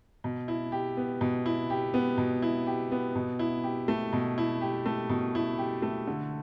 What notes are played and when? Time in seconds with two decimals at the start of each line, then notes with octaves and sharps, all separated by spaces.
0.24 B2
0.48 E4
0.72 G4
0.97 B3
1.21 B2
1.46 E4
1.70 G4
1.94 B3
2.18 B2
2.42 E4
2.67 G4
2.92 B3
3.15 B2
3.39 E4
3.64 G4
3.88 A3
4.13 B2
4.38 E4
4.61 G4
4.86 A3
5.09 B2
5.35 E4
5.58 G4
5.82 A3
6.07 D3